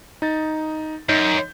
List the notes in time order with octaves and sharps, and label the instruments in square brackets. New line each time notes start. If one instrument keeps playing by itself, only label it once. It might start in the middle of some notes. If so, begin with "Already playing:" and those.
[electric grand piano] D#4 A6
[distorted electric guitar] F#2 [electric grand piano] D#4 D#5 G6